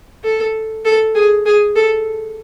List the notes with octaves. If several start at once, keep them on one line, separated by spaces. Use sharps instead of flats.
A4
A4
G#4
G#4
A4